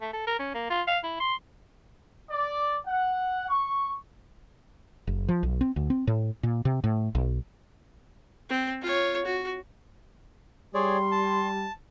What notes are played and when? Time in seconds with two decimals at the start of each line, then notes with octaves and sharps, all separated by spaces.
0.01 A3
0.13 A4
0.27 A#4
0.39 C#4
0.54 A#3
0.70 F4
0.87 F5
1.03 E4
1.20 C6
2.30 D5
2.86 F#5
3.48 C#6
5.07 F#1
5.28 F3
5.43 B1
5.61 C4
5.76 D2
5.90 C4
6.07 A2
6.43 A#2
6.65 C3
6.84 A2
7.15 B1
8.50 C4
8.82 F4 C#5
9.25 F#4
10.74 G3 G#4 C#5 D5 C6
11.11 A5